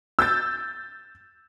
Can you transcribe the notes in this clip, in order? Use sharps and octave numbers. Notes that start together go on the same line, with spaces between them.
E6 G6 A6